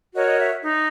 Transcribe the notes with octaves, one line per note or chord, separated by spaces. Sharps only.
F#4 A#4 C#5 D#5
D#5
E5
D#4